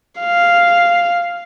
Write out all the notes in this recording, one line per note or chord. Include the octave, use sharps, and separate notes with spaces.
F5